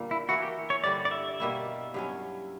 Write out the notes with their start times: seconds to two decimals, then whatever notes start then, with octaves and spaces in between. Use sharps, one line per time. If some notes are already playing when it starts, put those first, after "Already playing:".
Already playing: A#2 D3 G3 A#3
0.11 E4
0.29 E3 A#3 E4 F#4
0.42 G4
0.70 C#5
0.84 G2 D3 G3 D5
1.05 D5
1.11 E5
1.40 B2 G3 A#3 E4
1.94 G2 F#3 C#4